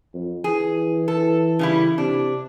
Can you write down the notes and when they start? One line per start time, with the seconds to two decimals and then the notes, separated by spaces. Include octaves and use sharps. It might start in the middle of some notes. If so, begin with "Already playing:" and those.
0.14 F2
0.44 E3 G#4
1.08 A4
1.59 C#3 G3 E4
1.98 C3 D4